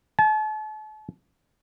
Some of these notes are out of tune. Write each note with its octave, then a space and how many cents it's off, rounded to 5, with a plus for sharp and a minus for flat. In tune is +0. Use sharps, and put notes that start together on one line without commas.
A5 -40